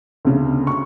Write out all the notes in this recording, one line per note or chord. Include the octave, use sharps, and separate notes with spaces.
D2 C#3
C#6